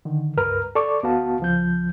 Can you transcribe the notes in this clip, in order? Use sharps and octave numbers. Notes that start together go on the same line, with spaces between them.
D3 D#3
C#2 G2 A#4 B4 A#5 F6
A4 D5 C#6 D6
D2 B3 F#4 F5 A5
C#2 F3 G6